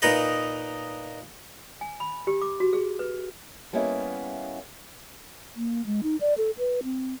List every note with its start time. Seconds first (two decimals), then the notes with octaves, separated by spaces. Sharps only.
0.02 A#2 D#4 B4 D#5
1.81 G#5
2.00 B5
2.27 G4
2.42 D6
2.60 F#4
2.73 G#4
2.99 B4
3.73 G3 A#3 B3 C#4 E4 D#5
5.56 A#3
5.86 G#3
6.03 D#4
6.21 D5
6.38 A4
6.58 B4
6.84 C4